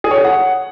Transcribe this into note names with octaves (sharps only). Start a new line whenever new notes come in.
G#4
C#5
G#4
F#5